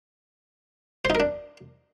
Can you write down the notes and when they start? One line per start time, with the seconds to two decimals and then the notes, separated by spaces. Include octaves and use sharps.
1.05 C5
1.10 D#4
1.15 A#4
1.20 D4